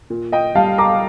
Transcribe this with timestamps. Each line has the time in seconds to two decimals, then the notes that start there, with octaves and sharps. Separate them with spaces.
0.10 A#2
0.32 D#5 G5
0.55 G3 F5 A5
0.78 A#5 D6